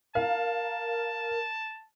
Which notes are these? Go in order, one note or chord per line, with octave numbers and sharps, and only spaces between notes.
A#4 F5 A5